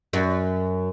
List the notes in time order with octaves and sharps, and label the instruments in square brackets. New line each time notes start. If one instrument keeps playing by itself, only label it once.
[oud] F#2